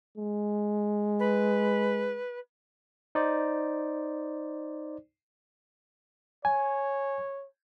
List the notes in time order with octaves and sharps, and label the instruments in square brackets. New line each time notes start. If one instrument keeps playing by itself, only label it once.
[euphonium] G#3
[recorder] B4
[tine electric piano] D#4 C5 D5
[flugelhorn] C#5 [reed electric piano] G#5